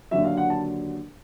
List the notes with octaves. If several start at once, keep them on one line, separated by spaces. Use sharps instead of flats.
D#2 D3 F#3 E5
F5
F#5
A5